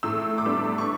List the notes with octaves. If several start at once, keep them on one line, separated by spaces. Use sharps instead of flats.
A2 E6
D6
G3 B3 D4 E6
C#6